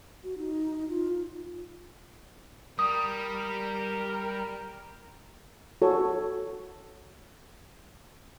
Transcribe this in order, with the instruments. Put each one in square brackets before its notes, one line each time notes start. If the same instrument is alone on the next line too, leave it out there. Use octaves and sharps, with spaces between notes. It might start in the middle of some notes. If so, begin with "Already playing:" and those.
[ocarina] F#4
D#4
F4
[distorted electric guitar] G3 [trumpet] A#4 [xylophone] D#6
[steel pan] F#4 A4 C#5